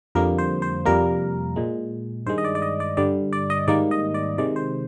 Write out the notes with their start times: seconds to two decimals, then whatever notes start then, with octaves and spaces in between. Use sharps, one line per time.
0.15 F2 D3 G3 A#3 A#4
0.38 C5
0.62 C5
0.85 F2 C3 G3 A#3 A#4
1.56 A#2 G#3
2.26 G2 D#3 G#3 C5
2.38 D#5
2.45 D5
2.55 D5
2.62 D#5
2.80 D5
2.97 G2 D3 G3 D5
3.33 D5
3.50 D#5
3.68 G#2 D#3 G3 A#3 D5
3.91 D#5
4.14 D5
4.38 C3 D#3 G#3 D5
4.56 C5